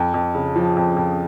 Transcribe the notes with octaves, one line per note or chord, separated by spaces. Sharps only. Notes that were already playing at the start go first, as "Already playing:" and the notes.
Already playing: F2
F2
C#3
F3
F2
F2